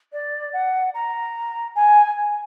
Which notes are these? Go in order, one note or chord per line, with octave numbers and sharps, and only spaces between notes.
D5
F#5
A#5
G#5